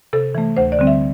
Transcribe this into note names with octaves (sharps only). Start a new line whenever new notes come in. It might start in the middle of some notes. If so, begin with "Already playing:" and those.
C3 A4
E3 A3
D2 C5
D5
D3 G3 C4
E5